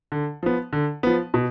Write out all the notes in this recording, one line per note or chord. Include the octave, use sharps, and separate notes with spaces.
D3
F3 B3
D3
F3 B3
B2